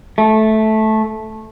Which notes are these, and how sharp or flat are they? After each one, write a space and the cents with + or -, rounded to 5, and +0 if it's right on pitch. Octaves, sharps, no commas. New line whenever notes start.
A3 -10